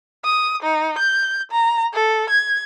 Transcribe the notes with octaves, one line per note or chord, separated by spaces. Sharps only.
D#6
D#4
G6
A#5
A4
G#6